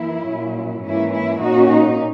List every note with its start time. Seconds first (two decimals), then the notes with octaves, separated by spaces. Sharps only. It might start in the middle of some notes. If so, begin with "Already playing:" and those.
Already playing: F#2 E3 A#3 E4
0.27 A#2 F#3 C#4
0.83 G#2 E3 A#3 C#4 E4
1.13 E4
1.41 A#2 A#3 C#4 D#4 F#4
1.71 D#4